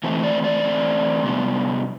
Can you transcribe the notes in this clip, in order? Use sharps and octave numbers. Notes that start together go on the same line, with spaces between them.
E3 A3 C4
D5
D5
E3 A3 C4
C3 G3 B3 D4